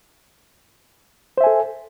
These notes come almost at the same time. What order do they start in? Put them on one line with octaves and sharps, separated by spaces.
C5 E5 G#5 A4